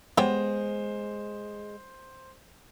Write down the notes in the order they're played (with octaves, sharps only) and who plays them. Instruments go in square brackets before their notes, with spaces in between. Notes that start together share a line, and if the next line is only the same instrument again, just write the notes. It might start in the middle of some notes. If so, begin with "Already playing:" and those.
[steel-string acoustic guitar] G#3 [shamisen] B3 G4 C#5 [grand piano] C5